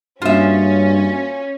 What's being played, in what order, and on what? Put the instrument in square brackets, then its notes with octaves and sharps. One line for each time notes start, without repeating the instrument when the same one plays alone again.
[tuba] G2 [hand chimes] A#3 F#4 A6 [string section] C#4 [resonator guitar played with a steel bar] F4 E5